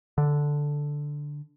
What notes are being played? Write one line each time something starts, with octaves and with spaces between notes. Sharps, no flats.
D3